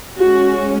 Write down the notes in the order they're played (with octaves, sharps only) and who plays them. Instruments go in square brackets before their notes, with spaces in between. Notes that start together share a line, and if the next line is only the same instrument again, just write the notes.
[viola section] G#3 C#4 F#4